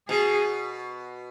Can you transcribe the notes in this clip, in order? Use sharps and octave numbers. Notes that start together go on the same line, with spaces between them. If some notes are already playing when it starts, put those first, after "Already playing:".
B2 G#4